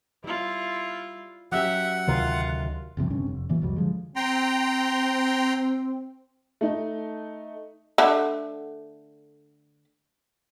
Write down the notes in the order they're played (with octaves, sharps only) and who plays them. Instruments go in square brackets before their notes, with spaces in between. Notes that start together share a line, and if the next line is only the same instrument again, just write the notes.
[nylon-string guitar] G3 [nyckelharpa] E4 F4
[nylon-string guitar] F#3 C#4 G4 [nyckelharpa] E5 [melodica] F#5
[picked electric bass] D2 C3 D#3 [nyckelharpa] F4
[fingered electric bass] F#1 C2 C3 F3
G1 G2 C3 C#4
F1
A#2 E3 F#3
C2 F2 F#3 G3
D3 F3 G#3
[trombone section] C4 [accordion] G5 A#5 C6
[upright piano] A3 D#4
[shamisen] D3 A3